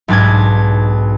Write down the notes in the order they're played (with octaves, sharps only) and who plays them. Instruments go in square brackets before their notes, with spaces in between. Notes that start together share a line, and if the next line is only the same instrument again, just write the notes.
[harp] B1 G#2 D4 D6 G#6